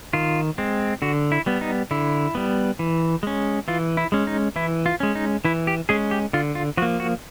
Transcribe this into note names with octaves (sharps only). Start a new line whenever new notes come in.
D#3 F4
G#3 C4
D3 F#4
E4
G3 B3
D#4
D3 E4
G3 B3
E3
G#3 C#4
E3 F4
E4
G#3 C#4
D#4
E3 E4
F4
G#3 C#4
D#4
E3 E4
G4
G#3 C#4 G#4
G4
D3 F4
F4
F3 A#3 F#4
F#4